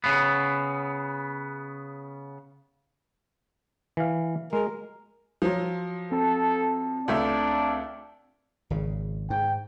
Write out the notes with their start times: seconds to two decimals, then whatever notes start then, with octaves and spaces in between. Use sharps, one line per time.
0.04 C#3 B3
3.97 E3 F5
4.53 G#3 A#4
5.42 F3 F#3
6.12 C4 A4 A5
7.08 C#2 A3 D4 E5
8.70 G#1 C#3
9.30 G#2 G5